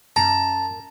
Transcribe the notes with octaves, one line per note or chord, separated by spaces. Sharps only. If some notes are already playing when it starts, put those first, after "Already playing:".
F#2 A5 A#5